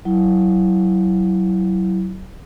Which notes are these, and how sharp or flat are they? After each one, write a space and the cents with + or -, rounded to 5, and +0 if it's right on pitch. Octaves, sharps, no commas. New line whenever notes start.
F#3 +25 E4 +0